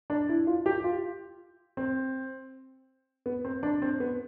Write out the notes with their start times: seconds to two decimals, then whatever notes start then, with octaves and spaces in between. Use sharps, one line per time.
0.10 D4
0.29 E4
0.47 F4
0.66 G4
0.84 F4
1.77 C4
3.26 B3
3.45 C4
3.63 D4
3.82 C4
4.00 B3